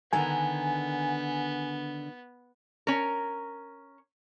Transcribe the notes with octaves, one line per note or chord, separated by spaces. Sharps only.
D3 D#3 B3 G#5 A#5
C#4 A#4